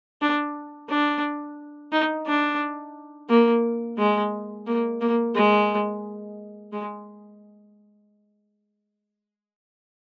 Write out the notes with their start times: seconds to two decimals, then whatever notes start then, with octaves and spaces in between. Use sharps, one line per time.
0.21 D4
0.89 D4
1.92 D#4
2.26 D4
3.29 A#3
3.98 G#3
4.67 A#3
5.01 A#3
5.35 G#3
6.72 G#3